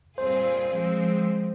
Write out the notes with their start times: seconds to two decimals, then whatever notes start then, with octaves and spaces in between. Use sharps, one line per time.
0.18 A#2 G3 C4 F4 G#4 C5
0.70 F3 G#3 C4